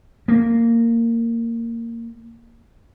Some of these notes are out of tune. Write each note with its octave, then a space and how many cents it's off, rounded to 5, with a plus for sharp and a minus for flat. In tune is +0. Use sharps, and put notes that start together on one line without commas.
A#3 -15